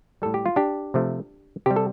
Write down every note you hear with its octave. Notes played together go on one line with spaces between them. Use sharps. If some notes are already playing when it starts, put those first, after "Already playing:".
A2 G3 A4
G4
F4
D4 G4
C3 F3 A3
C3 G3 G4
A4